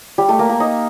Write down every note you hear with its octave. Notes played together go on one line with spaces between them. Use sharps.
G3 G4
A3 A4
A#3 A#4
A#3 A#4
D#4 D#5